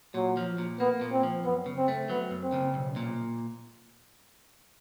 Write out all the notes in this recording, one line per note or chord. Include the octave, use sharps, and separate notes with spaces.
A#2 F#3
F3
A#2
A#3 B3
A#2
C4
F3
F#2 B3
C#3
C4
A3
F#3 B3
F#2
C4
C#3
B1
A#2